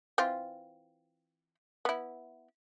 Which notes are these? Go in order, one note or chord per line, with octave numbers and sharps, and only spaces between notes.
E3 C4 F4
B3 E4